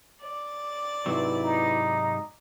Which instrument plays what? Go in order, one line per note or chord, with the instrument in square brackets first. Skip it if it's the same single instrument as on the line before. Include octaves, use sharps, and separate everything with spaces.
[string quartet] D5
[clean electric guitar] G#2 C3 F#3 [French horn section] E4 B4
[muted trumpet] D#4